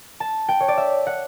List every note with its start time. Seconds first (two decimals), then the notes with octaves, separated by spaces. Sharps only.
0.20 A5
0.48 G5
0.60 C#5
0.68 D5
0.77 E5
1.07 F#5